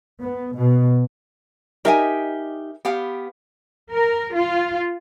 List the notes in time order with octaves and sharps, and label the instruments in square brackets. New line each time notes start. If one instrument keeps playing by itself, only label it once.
[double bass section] B3
B2
[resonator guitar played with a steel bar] D#4 G4 [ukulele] A#4 E5 G#5
[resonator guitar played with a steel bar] B3 G4 F5
[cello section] A#4
F4